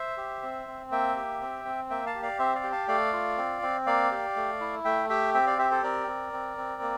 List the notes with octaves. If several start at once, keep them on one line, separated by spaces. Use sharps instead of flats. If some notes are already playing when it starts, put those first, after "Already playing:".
Already playing: C5 E5
G4
C4
C4
A#3 E5 G5
G4
C4
C4
A#3 E5 G5
F5 A5
G4
D5 F5
C4 C5 E5
D5 F5
G4
F5 A5
A3 D5 F5
F4
C4
C4
A#3 D5 F5
G4
A3
E4
A3 E5 G5
G4 E5 G5
C4 E5 G5
D5 F5
G4 C5 E5
A4 C5
C4 A#4 D5
C4
C4
C4
A#3